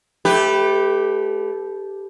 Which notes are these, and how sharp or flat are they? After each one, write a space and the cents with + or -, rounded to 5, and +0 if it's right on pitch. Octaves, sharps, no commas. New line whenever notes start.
A3 -25 G4 +0 B4 +0